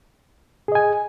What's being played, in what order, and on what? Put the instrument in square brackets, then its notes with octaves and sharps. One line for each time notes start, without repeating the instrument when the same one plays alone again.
[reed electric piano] G#4
D#5
G#5